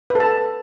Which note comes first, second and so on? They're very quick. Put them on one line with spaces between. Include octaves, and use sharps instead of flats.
B4 A4 A5